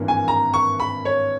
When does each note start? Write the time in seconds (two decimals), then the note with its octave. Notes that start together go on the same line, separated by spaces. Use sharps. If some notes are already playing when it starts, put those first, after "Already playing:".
Already playing: G#1 G2 E3 A#3
0.08 G#5
0.28 A#5
0.54 C#6
0.80 B5
1.05 C#5